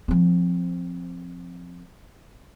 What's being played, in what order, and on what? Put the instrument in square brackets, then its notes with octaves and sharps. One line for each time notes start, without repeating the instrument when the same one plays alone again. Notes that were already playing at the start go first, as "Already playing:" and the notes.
[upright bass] F3 C4